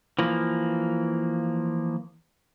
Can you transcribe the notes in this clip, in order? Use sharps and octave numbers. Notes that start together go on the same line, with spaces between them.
E3 F3 A#3